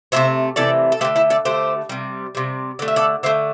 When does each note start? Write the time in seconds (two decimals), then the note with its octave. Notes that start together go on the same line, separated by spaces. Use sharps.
0.12 C3 E3 A3 C5 E5
0.56 C3 E3 A3 A4 D5
0.92 A4
1.01 A3 G4 C5
1.04 D3
1.16 E4 A4
1.30 A4 D5
1.45 D3 A3 G4 C5
1.89 C3 G3
2.35 C3 G3
2.79 D3 A3 D5
2.88 E5
2.96 A4 D5
3.23 D3 A3 C5 E5